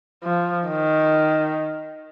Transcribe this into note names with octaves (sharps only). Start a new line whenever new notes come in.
F3
D#3